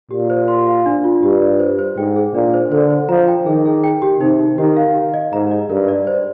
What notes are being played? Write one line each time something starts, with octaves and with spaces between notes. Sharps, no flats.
A#2 G4
C5
C6
F5
D4
F4
G2 G4
D5
C5
C5
G#2 G5
G#4
A#2 D4
C5
D3 C5
C5
F3 A#5
G5
D#3 G#4
G#4
G5
G4
C3 D#4
D#4
D#3 G4
F5
G4
D#5
G#2 A#5
D#5
G2 A#4
D5
C5